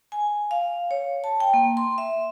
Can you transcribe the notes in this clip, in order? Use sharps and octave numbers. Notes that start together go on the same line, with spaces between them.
G#5
F5
C#5
A5
G5
A#3
C6
E5